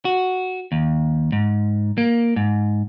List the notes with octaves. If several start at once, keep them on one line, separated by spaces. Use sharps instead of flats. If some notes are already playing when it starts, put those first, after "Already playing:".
F#4
D#2
G#2
A#3
G#2